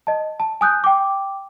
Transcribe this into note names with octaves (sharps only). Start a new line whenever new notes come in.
D#5 A5
A5
G#5 D#6 F#6 G6
G5 D6